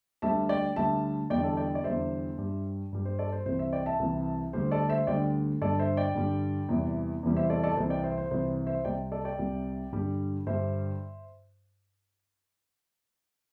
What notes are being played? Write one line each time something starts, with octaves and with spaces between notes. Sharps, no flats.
D2 D3 G3 E5 A5
D5 G5
D2 D3 G3 E5 A5
E2 D3 G3 D5 G5
A4 D5
D5 G5
D5
E2 D3 G3 C5 E5
G2 G3
G2 G3
C5
A4 D5
C5
C2 C3 E3 C5
C5 E5
D5 G5
E5 A5
C2 C3 E3
D2 D3 G3 C5
A4 D5
C5 E5
D2 D3 G3 D5 G5
G2 D3 G3 A4 D5
C5 E5
D5 G5
G2 D3 G3
E2 C3 E3 G3
E2 C3 E3 G3
C5 E5
A4 D5
A4 D5
C2 C3 E3 C5
D5 G5
C5 E5
C5
C2 C3 E3 C5
C5 E5
C2 C3 G3 D5 G5
A4 D5
D5 G5
C2 C3 G3
G2 D3 G3
G2 D3 G3 C5 E5